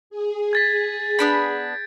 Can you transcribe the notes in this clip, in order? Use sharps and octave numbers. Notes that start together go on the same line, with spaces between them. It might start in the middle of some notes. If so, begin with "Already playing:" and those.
G#4
G#6 A6 B6
B3 D4 B5 G6 A6 D7